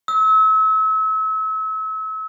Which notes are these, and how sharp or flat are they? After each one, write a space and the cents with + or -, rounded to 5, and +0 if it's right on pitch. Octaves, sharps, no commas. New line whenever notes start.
E6 -35